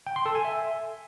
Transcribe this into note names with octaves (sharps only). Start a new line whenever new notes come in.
G5
C6
A4
G#5
E5